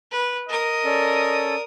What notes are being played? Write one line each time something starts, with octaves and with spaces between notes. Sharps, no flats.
B4
A#4 D#5 D#6
C#4 A4 D5